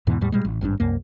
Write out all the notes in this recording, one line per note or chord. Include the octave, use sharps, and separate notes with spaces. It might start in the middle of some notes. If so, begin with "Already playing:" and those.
E2 G#2 B2 E3
E2 A2 G3
A#2 G3 G#3
A1
G#1 G2 C#3 D4
C2 F#2 A#3